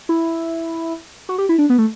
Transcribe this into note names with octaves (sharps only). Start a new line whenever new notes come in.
E4
F#4
G4
E4
D4
B3
A3